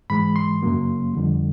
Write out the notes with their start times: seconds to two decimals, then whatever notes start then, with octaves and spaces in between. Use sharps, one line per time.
0.10 G#2 E3 G#3 B5
0.36 C6
0.62 F#2 C#3 F#3 A#3
1.14 F2 D3 G3